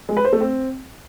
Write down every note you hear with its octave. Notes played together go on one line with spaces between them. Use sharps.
G#3
B4
C5
A3
C4